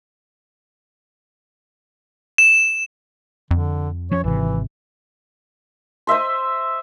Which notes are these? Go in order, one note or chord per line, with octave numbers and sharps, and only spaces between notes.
E7
F2 D3
F3 C#4 C#5
G#1 C3 E3
C5 D#5 E5 C6